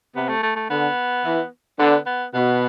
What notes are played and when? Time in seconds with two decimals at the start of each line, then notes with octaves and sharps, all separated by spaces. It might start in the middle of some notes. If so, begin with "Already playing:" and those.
0.16 C3 B3
0.29 A3
0.43 A3
0.56 A3
0.70 D3 B3
1.25 E3
1.79 D3 B3
2.06 B3
2.34 B2 B3